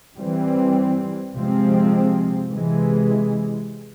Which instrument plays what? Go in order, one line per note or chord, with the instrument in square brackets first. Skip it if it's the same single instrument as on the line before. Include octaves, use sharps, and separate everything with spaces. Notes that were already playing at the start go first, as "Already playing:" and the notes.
[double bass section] E3 G3 C4
C3 F3 G#3 C4
C3 E3 G#3